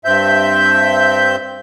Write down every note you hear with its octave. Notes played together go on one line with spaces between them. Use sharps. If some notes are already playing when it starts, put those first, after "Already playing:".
G2 C4 E5 G6